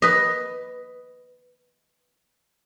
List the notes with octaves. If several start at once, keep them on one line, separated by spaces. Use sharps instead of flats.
B4 D#5